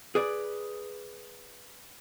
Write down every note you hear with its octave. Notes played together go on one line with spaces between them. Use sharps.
G#4 B4 D5